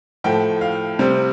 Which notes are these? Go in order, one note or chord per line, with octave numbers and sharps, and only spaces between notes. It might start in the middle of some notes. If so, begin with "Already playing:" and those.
A2 F3 A3 G5
F5
C3 G3 C4